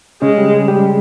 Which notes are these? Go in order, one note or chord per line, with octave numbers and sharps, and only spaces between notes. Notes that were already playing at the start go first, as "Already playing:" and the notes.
C#3 G#3 C#4
G3 G4
G#3 G#4
G3 G4